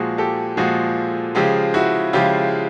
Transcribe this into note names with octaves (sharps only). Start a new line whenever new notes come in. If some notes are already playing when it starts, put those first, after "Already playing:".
Already playing: A#2 F3 G#3 F#4 G#4
G4 A4
A#2 F3 G#3 F#4 G#4
C#3 F3 G#3 F4 G4
E4 F#4
C#3 F3 G#3 F4 G4